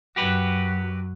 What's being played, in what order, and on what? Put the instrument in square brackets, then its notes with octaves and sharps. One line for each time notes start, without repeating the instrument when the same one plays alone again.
[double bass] F#2 F#3 [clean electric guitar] F#4 G4 B4